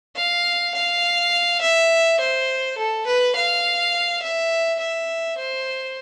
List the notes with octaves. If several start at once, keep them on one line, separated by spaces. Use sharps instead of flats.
F5
F5
E5
C5
A4
B4
F5
E5
E5
C5